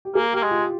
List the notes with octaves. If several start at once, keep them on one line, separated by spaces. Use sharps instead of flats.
G4
A#3 G#4
A#3 G4
G#3
F4